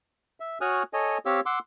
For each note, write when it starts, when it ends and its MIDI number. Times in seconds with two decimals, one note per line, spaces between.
0.40 0.58 76
0.61 0.83 66
0.61 0.83 73
0.61 0.83 80
0.61 0.83 87
0.61 0.83 89
0.61 0.83 90
0.93 1.18 69
0.93 1.18 73
0.93 1.18 75
0.93 1.18 80
1.26 1.40 60
1.26 1.40 67
1.26 1.40 73
1.26 1.40 77
1.26 1.40 88
1.46 1.59 78
1.46 1.59 84
1.46 1.59 86
1.46 1.59 88